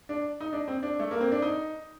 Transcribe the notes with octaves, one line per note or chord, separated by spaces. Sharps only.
D4
D#4
D4
C4
D4
A3
A#3
C4
D4
D#4